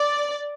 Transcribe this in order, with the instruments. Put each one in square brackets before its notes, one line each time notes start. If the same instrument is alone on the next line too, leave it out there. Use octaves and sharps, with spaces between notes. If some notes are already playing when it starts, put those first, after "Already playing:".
Already playing: [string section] D5